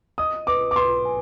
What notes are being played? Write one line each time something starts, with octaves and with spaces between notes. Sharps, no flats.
D#5 D#6
B4 D6
D6
B4 C6
G#5